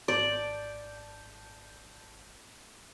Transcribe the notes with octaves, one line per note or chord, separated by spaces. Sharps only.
G#1 D5 A5 G6